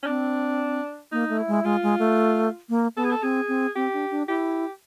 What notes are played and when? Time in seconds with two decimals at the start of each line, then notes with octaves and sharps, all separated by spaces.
0.02 C#4
0.06 C4 D4
1.12 A#3 D#4
1.29 A3
1.38 E4
1.48 G#3
1.53 E4
1.64 G#3 F4
1.83 G#3
1.99 A3
2.69 A#3
2.97 B3 A4
3.04 G#4
3.11 A4
3.22 C4 G#4
3.48 C4
3.76 C4 G4
3.93 D4
4.11 D4
4.28 E4 G4